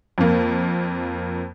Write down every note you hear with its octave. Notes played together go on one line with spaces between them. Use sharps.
F2 A#3